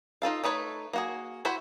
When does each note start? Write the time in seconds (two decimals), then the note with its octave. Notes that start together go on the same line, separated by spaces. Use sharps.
0.22 D#4 F4 A4 F5
0.44 A3 D#4 B4 C#5
0.93 A#3 F#4 G#4
1.45 E4 F#4 C5 B5